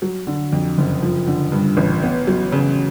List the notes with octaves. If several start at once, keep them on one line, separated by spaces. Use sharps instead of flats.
F#3
D3
F2
F#1
F3
D3
G2
A1
B3
F#3
C#3